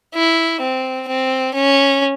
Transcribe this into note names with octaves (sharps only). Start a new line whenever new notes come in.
E4
C4
C4
C#4